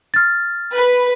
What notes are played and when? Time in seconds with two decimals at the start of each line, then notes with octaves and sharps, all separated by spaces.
0.14 F6 A6
0.74 B4